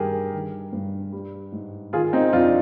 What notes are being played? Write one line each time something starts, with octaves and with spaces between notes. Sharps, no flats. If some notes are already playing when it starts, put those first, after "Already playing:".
Already playing: G2 D#3 G4 G#4 A#4
D#3
G2
G3
G#2
D#3 F4 G#4
C4 D#4
F2 D4 F4